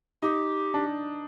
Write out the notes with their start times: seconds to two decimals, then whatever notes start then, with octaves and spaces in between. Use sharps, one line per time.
0.22 D#4 G4
0.74 D4